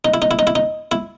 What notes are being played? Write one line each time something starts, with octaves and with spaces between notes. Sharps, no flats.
D#4
E4
D#4
E4
D#4
E4
D#4
E4